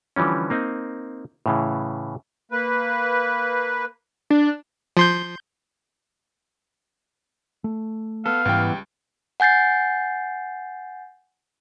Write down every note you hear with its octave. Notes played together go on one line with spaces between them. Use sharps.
D3 E3 F3 G3 C#4
A#3 C4 D#4
A2 C#3 E3
A#3 B4
D4
F3 C6 G6
A3
B3 A4 F5
C#2 G#2 E3 G3 B3 G5
F#5 G#5 G6 A6 C7